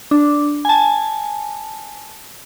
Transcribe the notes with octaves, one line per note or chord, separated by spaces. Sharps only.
D4
G#5 A5